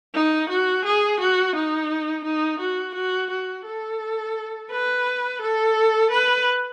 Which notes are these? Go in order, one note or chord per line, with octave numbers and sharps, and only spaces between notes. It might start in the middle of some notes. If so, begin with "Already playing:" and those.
D#4
F#4
G#4
F#4
D#4
D#4
F#4
F#4
F#4
A4
B4
A4
B4